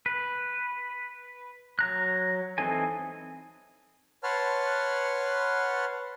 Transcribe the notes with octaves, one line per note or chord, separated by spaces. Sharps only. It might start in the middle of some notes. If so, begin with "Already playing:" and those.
B4
F#3 A#5 F#6
E3 C4 D#4 A4 G#5
B4 C#5 F#5 A5 C6 F6